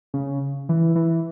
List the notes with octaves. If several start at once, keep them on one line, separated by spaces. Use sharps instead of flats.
C#3
E3
E3